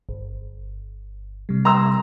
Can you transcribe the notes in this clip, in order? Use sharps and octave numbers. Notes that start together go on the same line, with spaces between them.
G1
C3 G3
A#5 C6 E6